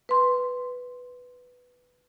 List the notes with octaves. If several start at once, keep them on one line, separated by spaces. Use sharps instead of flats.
B4 C6